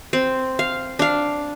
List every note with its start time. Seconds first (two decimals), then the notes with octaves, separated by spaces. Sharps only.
0.13 C4
0.59 F5
0.99 D4 F5